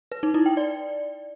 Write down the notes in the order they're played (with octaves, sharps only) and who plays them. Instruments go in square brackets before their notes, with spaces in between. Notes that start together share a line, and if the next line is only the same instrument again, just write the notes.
[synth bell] B4
D#4
E4
G5
D5